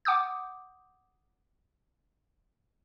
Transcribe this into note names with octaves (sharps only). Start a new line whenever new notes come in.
F#5 D6 D#6 G6